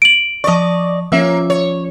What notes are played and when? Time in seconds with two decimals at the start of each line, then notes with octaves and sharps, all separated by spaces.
0.02 D7 F#7
0.44 F3 D5 D#5 C#6
1.12 F3 A#3 C#4 E5 E6
1.50 C#5